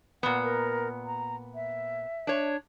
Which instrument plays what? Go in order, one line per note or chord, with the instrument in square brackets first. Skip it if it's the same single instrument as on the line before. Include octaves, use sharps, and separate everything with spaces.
[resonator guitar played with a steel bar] A#2 B3 [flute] F#5
[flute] A#4
A#5
E5
[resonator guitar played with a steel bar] D4 C#5